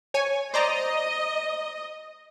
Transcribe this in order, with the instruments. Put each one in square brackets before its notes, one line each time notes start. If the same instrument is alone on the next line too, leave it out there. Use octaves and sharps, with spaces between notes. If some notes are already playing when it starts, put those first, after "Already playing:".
[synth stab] C#5 G#5
[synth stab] C5 D5 A#5 [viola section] D#5